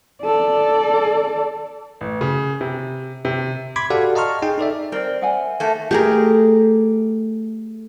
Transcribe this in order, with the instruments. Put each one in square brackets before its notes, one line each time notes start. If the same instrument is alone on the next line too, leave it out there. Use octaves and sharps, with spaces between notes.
[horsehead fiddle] A4 D5
[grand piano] A1
C#3
C3
C3
[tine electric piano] B5 C6 D6 G#6 B6
F#4 G4 A4 D5 F5 F#5
D#5 A5 A#5 C6 C#6 F6
D#4 G#4 G5 G#5
D#4 A4 D5 E5
[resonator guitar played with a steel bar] C4 [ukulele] A#4 D5
[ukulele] E5 F#5 G#5
[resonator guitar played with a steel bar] A3 A#3
[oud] A3 [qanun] G4 G#4 A#4